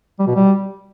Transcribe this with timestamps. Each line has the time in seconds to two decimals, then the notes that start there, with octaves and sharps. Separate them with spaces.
0.19 G3
0.27 B2
0.36 G3